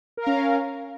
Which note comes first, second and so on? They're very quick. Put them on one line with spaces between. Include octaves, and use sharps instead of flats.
A#4 F5 C#4